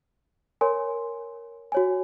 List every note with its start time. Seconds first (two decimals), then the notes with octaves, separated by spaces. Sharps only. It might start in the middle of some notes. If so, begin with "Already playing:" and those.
0.61 A#4 C#5 G#5 C6
1.72 F#4 C#5 G#5